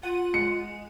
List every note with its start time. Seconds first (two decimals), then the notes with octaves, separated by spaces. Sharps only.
0.03 F4 F#5 D#7
0.34 G#3 C#7